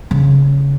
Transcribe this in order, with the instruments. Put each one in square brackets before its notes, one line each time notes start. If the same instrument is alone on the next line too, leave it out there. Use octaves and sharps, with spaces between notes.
[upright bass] C#3